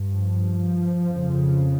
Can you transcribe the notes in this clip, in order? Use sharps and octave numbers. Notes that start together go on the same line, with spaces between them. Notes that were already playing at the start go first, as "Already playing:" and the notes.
Already playing: G2
F3
F2 C#3